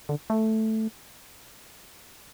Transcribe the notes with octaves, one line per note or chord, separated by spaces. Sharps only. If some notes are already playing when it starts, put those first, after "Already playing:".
D3
A3